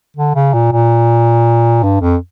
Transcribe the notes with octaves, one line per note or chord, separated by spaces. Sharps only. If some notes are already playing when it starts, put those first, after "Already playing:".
D3
C#3
A#2
A#2
G2
F2